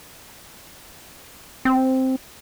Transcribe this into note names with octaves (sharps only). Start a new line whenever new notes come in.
C4